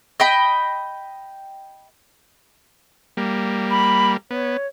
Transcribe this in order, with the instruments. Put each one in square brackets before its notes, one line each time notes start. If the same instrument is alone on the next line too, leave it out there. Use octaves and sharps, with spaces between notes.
[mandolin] D#5 G5 B5
[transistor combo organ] G3 A#3
[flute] B5
[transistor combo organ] B3 [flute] C#5